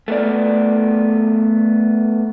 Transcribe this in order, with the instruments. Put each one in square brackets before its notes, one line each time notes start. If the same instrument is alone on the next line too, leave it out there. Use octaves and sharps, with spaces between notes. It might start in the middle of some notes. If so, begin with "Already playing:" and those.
[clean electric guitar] A3 B3 D5